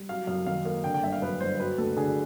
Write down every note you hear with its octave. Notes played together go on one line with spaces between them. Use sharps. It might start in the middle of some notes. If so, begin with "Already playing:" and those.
Already playing: G3
F#3 F5
F#2 F5
D#3 F5
A#3 F5
D3 G5
G5
G1 E5
F5
F#2 B4
G1 C5
F#3 B4
D2 A4
D3 G#4